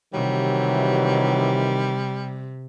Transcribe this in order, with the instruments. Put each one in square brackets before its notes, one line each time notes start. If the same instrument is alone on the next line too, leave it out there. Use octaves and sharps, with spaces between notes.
[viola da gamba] C3 [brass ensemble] D#3 E3 [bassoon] F#3 [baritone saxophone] G3